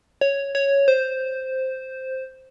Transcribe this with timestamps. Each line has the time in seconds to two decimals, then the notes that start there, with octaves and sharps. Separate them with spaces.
0.21 C#5
0.55 C#5
0.88 C5